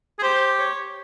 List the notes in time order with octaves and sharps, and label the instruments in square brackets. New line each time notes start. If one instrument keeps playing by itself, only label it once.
[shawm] G#4
[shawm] G4 [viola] C5
[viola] C#5